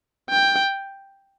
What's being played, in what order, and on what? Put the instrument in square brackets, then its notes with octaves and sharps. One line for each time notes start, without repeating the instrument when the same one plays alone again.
[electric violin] G5